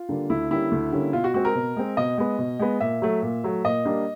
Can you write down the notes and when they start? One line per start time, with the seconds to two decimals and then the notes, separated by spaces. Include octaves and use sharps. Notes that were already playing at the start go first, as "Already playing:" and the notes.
Already playing: F4
0.09 D3 G3 A#3 D4
0.30 D2 E4
0.51 D3 G3 A#3 C#4 E4
0.71 D2
0.92 D3 G3 A#3 C#4
1.13 B2 F4
1.24 F#4
1.34 G#3 C4 F#4
1.45 A#4
1.55 B2
1.77 G#3 C4
1.97 B2 D#5
2.18 G#3 B3
2.39 B2
2.60 G#3 B3
2.80 A#2 E5
3.02 F#3 A3
3.22 A#2
3.44 F#3 A3
3.64 A#2 D#5
3.85 G3 A#3 D4